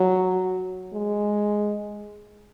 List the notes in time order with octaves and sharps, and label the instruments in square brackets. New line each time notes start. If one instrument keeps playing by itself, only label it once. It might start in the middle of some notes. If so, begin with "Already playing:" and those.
Already playing: [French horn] F#3
G#3